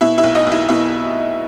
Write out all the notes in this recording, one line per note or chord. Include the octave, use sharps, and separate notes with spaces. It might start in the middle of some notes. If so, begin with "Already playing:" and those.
B2 E4 E5
E4 E5
B1
D#4 D#5
B1 E4 E5
B2 E4 E5